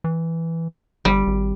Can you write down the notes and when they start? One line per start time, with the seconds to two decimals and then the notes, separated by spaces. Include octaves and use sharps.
0.04 E3
1.05 G1 G3
1.27 G#1